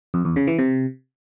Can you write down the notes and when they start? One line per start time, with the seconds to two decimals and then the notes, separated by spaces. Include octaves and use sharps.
0.14 F2
0.25 E2
0.36 C#3
0.47 E3
0.59 C3